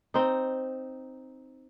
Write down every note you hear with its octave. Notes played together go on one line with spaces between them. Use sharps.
C4 D#4